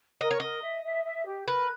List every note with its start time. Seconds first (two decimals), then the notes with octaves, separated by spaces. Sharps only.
0.21 A#4 D#5
0.31 C#5
0.40 A#4 D#5
0.63 E5
0.84 E5
1.05 E5
1.26 G4
1.47 A#4 B4